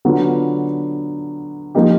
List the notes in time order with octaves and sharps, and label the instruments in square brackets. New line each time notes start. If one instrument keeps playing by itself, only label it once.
[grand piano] D3 F#3 B3 D4 F4
F3 A#3 D#4 G4